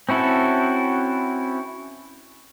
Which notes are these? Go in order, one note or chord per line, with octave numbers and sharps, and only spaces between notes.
C4 C#4 E4 F#4 A4